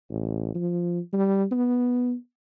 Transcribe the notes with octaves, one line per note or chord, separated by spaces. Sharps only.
A1
F3
G3
B3